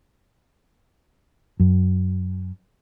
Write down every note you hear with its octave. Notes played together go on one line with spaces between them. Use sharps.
F#2